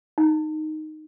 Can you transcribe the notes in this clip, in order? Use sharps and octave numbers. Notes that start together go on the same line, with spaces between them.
D#4